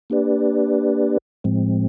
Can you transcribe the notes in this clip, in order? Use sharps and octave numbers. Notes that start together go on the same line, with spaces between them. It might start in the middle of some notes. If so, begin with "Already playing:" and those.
A#3 D4 G4 B4 D5
A2 F3 G#3 C4